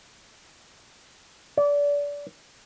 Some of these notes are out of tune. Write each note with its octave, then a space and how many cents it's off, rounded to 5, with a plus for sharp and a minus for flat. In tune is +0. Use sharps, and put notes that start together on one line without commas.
D5 -25